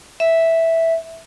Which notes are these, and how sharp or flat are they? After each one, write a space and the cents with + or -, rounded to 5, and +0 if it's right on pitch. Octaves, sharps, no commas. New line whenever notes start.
E5 -5